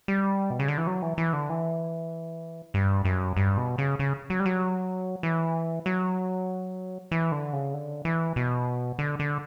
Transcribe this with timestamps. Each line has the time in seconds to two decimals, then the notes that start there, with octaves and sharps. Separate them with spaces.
0.08 G3
0.50 B2
0.59 C#3
0.68 D3
0.78 E3
0.87 F#3
1.02 E3
1.18 E3
1.33 D3
1.49 E3
2.74 G2
3.05 F#2
3.37 G2
3.57 B2
3.78 C#3
3.99 C#3
4.30 F#3
4.40 G3
4.46 F#3
5.23 E3
5.86 F#3
7.11 E3
7.32 D3
7.53 C#3
7.74 D3
8.05 E3
8.36 B2
8.99 D3
9.19 D3